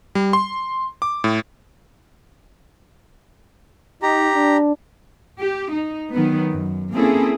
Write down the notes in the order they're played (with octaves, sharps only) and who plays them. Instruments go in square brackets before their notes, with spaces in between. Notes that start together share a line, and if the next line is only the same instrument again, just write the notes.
[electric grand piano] G3
C6
D6
A2
[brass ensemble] D#4 [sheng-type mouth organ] G4 A#5
[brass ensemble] D4
[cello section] G4
D#4
D#3 F#3 B3
F#2
A#3 C4 C#4 E4 G#4 A4